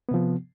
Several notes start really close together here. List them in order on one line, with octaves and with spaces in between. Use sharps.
B3 C3 F3